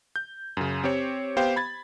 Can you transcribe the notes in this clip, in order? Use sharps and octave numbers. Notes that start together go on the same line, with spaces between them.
G6
F#2 C#3
C4 G4 C5 C#5
B3 G4 C5 F5 G5
B5 G#6 A6